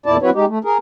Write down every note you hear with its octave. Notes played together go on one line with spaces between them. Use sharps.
E2 A#2 E4 D5 A5
F#3 C4 E4 F#4 B4 C#5
G#3 D#4 G4
A3
G#4 A#4